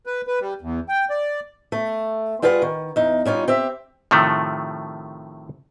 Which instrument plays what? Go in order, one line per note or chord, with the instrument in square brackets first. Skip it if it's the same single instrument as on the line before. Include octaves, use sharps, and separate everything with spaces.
[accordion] B4
B4
G3
E2
G5
D5
[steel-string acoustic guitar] A3
G3 F4 G#4 B4 D5 F#5
D#3
E2 D#4
G3 C#4 D#4 F4
C4 G4 E5
[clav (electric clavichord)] A2 C3 D#3 F3 A3